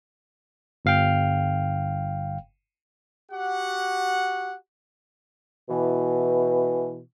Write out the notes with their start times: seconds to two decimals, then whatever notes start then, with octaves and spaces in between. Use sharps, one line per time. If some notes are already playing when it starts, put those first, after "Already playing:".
0.85 G1 F5 G5
3.32 F#4 G4 F#5
5.69 B2 E3